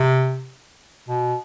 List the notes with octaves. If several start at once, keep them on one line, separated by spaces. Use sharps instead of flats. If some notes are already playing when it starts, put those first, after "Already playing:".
Already playing: C3
B2